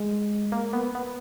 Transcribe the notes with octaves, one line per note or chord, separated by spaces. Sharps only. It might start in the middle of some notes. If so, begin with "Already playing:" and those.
Already playing: G#3
A#3
B3
B3